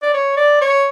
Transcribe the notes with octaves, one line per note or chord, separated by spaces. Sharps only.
D5
C#5
D5
C#5